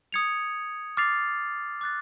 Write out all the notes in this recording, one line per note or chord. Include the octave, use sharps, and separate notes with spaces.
D#6 G#6 C#7 F7
D6 F6 A6 C7 F7
D6 F#6 A6